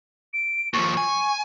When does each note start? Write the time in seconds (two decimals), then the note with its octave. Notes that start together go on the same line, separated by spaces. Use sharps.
0.33 D7
0.74 D#2 F3 C#6
0.97 G#5